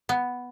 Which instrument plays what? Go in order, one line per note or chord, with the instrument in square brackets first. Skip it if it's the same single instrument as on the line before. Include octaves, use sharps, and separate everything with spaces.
[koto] B3